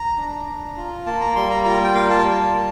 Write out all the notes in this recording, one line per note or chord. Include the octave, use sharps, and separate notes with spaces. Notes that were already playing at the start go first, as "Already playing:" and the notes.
Already playing: A#5
D4
D4
F4
A#3 A5
A#5
G3 C6
A#5
F4 A#5
G5
A#3 F5
A5
G3
A#3